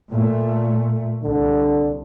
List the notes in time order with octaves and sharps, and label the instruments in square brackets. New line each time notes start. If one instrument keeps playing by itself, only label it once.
[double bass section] A#2 A3
[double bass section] C2 [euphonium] D3